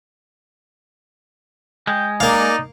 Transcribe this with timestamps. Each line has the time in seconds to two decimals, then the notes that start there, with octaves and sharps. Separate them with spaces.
1.87 G#3 G5
2.20 A#3 D#4 D5 F5